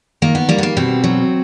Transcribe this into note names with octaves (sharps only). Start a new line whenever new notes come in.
D#3 A#3
B3
G3 A#3
B3
A#3
B2 C4
F#3